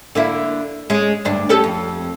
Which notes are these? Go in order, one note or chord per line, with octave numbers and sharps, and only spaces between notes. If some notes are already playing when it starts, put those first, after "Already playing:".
D3 A#3 E4
G#3 C#4
D2 G2 D4
C#4 G4 A4
F2